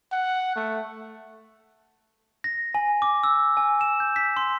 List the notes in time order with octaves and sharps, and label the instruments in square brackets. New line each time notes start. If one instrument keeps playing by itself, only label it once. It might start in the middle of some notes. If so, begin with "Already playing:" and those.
[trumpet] F#5
A3
[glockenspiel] A#6
G#5
D6
E6
G#5
E7
G6
B6
C6